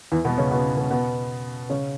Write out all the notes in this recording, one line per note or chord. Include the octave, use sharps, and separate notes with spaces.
E2 E3
B2 B3
C#3 C#4
B2 B3
B2 B3
B2 B3
C#3 C#4